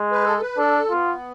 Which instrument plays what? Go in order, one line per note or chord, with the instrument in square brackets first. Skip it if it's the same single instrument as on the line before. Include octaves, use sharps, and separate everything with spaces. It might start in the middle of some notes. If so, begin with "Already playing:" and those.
Already playing: [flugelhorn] G#3
[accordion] B4
A4
B4
[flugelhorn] D4 [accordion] A4
[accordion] B3 [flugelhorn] F4